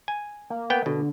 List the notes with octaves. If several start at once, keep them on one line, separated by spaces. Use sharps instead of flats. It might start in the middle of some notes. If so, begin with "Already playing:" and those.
G#5
A#3
B3 G5
B2 D3